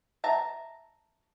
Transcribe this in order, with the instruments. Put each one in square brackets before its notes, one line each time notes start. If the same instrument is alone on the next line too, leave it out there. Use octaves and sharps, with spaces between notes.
[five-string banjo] E5 A5 A#5